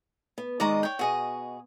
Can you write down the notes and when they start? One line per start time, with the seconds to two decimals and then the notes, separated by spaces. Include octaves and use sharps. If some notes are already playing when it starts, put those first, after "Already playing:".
0.38 B3
0.60 D#3 G#3 D5 D#5 A#5 C#6
0.83 C#5 G5
0.99 B2 F#4 G#4 D#5